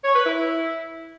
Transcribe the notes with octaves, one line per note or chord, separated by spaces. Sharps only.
C#5
B4
E4